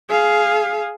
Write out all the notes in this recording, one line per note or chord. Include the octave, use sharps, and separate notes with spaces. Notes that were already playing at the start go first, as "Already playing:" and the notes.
G#4 F5